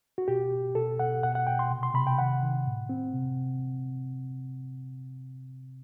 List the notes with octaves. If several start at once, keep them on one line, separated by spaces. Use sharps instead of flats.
F#4
B2 G4
B2
B2 A4
B2 F#5
B2 F#5
F#5
B2 G5
C6
C3
C6
C3 B5
G5
D#3 F#5
D#3
A2
C4
C3